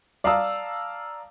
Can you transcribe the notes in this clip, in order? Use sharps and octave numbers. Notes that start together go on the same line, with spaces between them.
D5 F5 A5 A#5 D#6 E6